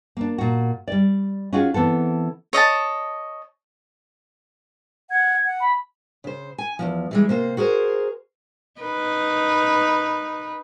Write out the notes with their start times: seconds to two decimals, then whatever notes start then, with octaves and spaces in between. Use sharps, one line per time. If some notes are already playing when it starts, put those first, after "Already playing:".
0.17 A#3 D4
0.38 A#2 F#4
0.88 G3 D5
1.53 C#4 D#4 F4 F#4 G#4
1.74 E3 B3 C4 A4
2.53 C#5 D#5 E5 A5
5.10 F#5 G#6
5.45 F#5
5.60 B5
6.24 C#3 C5
6.58 G#5
6.79 E2 B2 F3
7.11 E3 G3 G#3
7.29 C3 A#3 C5
7.57 F#4 G#4 A#4 C5
8.81 D#4 B4